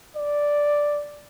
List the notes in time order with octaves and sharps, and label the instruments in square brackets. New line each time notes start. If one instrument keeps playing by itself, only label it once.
[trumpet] D5